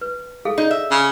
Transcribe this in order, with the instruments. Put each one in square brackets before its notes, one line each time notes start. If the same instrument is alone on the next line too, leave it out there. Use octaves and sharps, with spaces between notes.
[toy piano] B4
G#4 A4 F5
[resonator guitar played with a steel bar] D#4 [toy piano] D5
[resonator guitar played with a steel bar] E5
[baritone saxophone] C#3